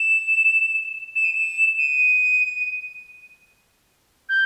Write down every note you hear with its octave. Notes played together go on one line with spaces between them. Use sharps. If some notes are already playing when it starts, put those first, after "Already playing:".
Already playing: E7
E7
D#7
E7
D#7
G6